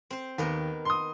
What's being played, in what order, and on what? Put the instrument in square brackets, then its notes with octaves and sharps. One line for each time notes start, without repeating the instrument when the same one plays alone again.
[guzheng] C4 C5
[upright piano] D#2 [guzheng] D#3 B3 A#4
[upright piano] C6 D#6